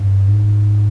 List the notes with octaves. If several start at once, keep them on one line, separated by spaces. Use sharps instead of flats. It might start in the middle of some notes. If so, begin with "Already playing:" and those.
Already playing: G2
G#2